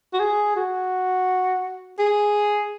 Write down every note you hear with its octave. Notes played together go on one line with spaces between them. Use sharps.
F#4
G#4
F#4
G#4